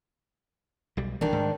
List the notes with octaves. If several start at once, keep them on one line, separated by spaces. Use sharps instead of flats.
B1 G3
D#3 E3 G3 D4
G#2